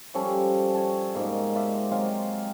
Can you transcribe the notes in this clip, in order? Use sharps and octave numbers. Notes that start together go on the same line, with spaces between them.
F3 G3 C#4 A4
C#5 A5
G#2 B2 A#3
F4 D5 E5
F#3 G#3 C4 F4